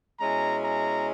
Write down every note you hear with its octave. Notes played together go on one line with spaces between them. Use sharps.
B2 G#3 C#4 E4 A#5
A#5